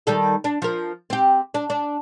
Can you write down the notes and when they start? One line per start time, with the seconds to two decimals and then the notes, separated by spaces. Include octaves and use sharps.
0.07 D#3 G3 A4
0.44 D4
0.62 F3 A#4
1.10 C4 G4
1.54 D4
1.70 D4